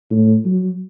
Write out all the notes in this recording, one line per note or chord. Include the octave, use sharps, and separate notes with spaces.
A2
F#3